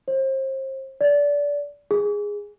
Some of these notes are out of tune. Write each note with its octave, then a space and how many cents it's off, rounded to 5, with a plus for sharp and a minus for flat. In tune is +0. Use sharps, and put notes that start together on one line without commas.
C5 +35
D5 -25
G#4 -10